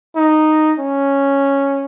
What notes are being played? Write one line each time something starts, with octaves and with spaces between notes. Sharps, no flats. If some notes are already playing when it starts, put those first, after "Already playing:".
D#4
C#4